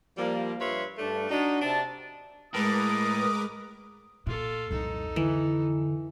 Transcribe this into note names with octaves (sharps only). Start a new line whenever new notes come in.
F3 G3 A#3
G2 F4 B4 C#5 E5 C6
G2 A3 D4
D4 D#4 F#4
C3 D4 A5
A2 G#3 A#4 B4 D6 D#6
A#2 F4 A4
C2 F2 A#2 D#4 A4
D3 E3